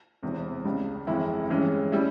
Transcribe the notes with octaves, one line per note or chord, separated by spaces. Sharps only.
E1 E2 C3 E3
C#2 C#3 G3
G1 F2 E3 G#3 E4
G2 E3 G#3 C#4
G3 C#4 E4